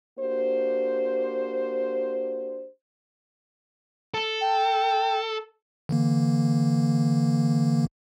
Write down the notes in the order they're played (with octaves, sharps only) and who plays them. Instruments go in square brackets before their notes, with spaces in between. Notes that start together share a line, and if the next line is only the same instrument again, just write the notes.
[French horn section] A#3 D4 F#4 G4 C5
[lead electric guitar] A4
[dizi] G5
[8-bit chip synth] D3 E3 A#3